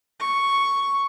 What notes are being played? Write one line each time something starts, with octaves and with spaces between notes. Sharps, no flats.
C#6